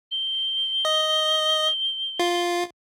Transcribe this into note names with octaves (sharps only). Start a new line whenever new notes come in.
G7
D#5
F4